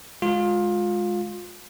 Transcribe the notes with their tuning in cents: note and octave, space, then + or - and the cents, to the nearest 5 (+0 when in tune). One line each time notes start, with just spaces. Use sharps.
G#3 +0 F4 +20